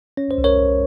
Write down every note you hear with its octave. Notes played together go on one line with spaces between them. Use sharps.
C#4 C#5
C5
C2
A#4 C#5
C2